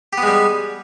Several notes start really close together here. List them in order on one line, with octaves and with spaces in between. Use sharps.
G4 B3 G#3 G3